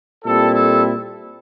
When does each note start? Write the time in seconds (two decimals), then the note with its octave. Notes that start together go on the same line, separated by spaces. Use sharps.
0.23 A#2 G3 C4 E4 A4
0.52 A4